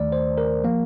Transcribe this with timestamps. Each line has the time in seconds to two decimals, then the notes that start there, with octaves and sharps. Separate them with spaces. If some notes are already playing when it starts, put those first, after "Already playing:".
Already playing: D#2 D#3 A3 D5
0.12 C5
0.38 A#4
0.64 F3 A#3